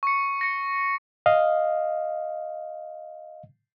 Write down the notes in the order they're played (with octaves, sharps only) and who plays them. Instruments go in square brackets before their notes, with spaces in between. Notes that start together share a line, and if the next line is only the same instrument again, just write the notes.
[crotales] C#6 C#7
A#6 C#7
[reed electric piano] D#5 F5